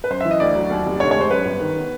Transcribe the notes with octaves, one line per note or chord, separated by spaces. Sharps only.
B4
F#2 C5
E3 E5
D#5
D2 D5
F#3
D#2
F1
D3 C#5
G#3 C#5
C5
F#2 B4
G1
D#3
B3